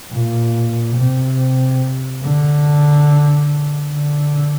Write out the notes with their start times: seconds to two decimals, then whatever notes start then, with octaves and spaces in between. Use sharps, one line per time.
0.12 A#2
0.96 C3
2.24 D3
3.93 D3